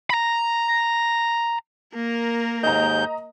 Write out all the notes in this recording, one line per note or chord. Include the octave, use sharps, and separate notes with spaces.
A#5 B5
A#3 A#4
D#2 G#2 D#5 A#5 G6